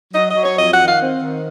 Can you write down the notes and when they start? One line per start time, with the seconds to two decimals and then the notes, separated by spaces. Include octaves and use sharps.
0.13 F#3 D#5
0.29 D#5
0.36 F#3
0.42 C#5
0.57 F2 D#5
0.72 F#5
0.79 D#3
0.86 F5
1.01 C4
1.22 D#3